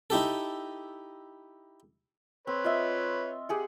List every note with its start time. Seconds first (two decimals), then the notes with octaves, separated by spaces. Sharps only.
0.10 D#4 E4 G4 A4
2.47 C4 B4 C#5
2.64 F4 D#5 E5
3.49 G4 G#4 F#5